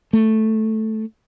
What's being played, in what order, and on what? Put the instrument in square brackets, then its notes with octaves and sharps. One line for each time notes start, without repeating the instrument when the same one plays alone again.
[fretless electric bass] A3